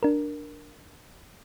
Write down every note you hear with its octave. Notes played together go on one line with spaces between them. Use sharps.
D4 A#4